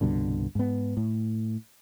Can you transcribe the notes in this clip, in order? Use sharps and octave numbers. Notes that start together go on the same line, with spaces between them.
C2 G2 B2 D3
G#2 B3
A2